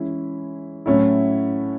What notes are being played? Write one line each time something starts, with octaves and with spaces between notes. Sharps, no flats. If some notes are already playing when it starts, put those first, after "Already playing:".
Already playing: E3 G#3 C#4 E4
A2 F#3 A3 C#4 E4